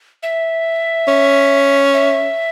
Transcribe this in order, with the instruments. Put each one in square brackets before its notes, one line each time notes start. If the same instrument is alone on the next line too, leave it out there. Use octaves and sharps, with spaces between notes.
[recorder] E5
[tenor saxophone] C#4
[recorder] E5